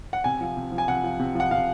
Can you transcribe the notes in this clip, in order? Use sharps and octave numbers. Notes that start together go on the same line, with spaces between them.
F#5
C3 G#5
F3
C3
F3
G#5
C3 F#5
F3
C3
F3 F#5
C3 F5